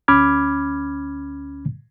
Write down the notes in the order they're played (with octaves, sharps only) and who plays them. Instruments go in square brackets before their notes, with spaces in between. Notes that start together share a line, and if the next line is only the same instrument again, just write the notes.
[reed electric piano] D2 C#4 B5 D6 F6 G#6